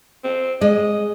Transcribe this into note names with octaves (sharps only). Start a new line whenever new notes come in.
C4
G#3 D#5